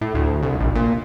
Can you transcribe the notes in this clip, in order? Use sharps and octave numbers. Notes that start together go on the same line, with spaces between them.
A2
D2
C2
A#1
A#2